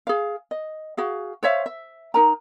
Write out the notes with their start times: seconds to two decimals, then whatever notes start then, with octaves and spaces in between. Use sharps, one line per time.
0.07 G#4 F5
0.51 D#5
0.97 F#4 G#4 F5
1.43 C5 C#5 E5 F5
1.66 E5
2.14 D#4 A#4 A#5